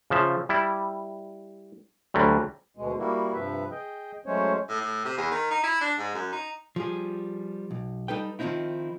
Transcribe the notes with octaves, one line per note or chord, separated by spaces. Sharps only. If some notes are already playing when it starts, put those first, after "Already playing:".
C#3 F3 E5
G3 E4
D2 D3 F#3 G3
D2 B2 G#3
G3 A#3 E4 F#4
G2 C3 F3 B4 E5
G#4 D#5 G5
F#3 G#3 A3 C#4 C5 C#5
A2
A2
C3
E2
D#3
D#4
E4
D4
G#2
F#2
D#4
F3 G3 G#4
B1
G3 D#4 A4 B4 G5
D#3 F3 F#3 C4 D#4 E4